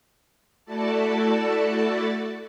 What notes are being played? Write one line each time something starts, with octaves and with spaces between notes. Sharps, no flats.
A3 E4 F#4 A4 D5 A5